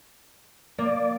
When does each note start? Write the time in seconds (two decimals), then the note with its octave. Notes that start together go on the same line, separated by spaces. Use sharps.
0.79 A#3 D5